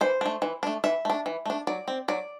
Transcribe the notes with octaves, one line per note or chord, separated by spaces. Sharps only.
E3 C5
A3 D4
E3
A3 D4
E3 E5
A3 D4
E3
A3 D4
F#3 D5
C4
F#3 D5